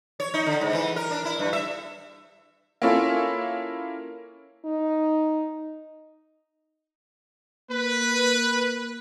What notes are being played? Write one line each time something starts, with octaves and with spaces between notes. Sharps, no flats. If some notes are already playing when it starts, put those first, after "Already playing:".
C#5
D#4
D3
G#2
E3
A#4
D4
E4
G2
E5
A#3 C#4 E4 F4 A4
D#4
A#3 B4